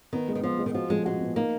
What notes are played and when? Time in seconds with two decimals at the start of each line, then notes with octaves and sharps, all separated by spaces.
0.13 D#3 B3
0.28 G#3
0.35 D#3
0.43 F3 B3
0.59 G#3
0.66 D#3
0.74 F3 F#4
0.90 F3 G#3
1.05 G#3 F#4
1.20 B3
1.36 A#3 D#4